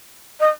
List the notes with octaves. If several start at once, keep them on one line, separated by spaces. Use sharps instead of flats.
D#5